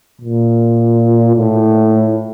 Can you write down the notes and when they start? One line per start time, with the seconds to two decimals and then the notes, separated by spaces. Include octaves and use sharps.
0.21 A#2
1.35 A2